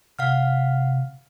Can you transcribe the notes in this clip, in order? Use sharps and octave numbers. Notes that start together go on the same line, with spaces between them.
C3 F5 F#5 F6